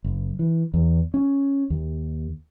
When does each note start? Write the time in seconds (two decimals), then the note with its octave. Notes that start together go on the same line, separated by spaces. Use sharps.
0.04 F#1
0.39 E3
0.74 E2
1.14 C#4
1.70 D#2